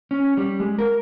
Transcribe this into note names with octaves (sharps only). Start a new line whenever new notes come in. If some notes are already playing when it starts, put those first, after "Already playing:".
C#4
G3
G#3
A#4